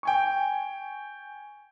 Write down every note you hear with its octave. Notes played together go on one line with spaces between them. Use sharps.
G5 G#5 C#6